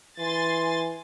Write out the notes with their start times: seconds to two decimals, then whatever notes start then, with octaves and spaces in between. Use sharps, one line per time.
0.19 E3 G#5 C6 A6